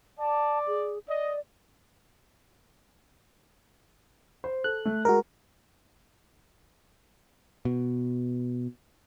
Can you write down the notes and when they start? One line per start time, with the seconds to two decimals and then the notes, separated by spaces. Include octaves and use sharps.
0.19 D5 A5
0.68 G#4
1.08 D5 D#5
4.44 C5
4.64 A4 F#6
4.85 A3
5.05 G#3 F#4 A#4
7.65 B2